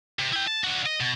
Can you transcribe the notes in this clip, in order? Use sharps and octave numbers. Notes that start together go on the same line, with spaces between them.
C3
E4 G5
A5
D4 F#4
D#5
B2